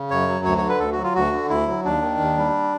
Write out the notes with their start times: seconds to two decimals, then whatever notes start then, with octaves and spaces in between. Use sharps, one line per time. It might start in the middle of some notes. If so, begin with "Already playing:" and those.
Already playing: C#3
0.10 F#2 C#5
0.28 F#3
0.45 D2 C#5
0.58 D3 C#5
0.69 B4
0.80 D2 A4
0.92 F#4
0.97 F#3
1.03 F4
1.15 D2 F#4
1.32 D3
1.49 D2 E4
1.68 F#3
1.84 D#2 D4
2.02 D#3
2.20 D#2
2.37 G3